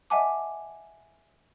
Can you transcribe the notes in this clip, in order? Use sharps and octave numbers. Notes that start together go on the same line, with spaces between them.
D#5 E5 F#5 G#5 A5 D6